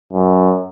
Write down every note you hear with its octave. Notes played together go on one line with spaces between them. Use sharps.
F#2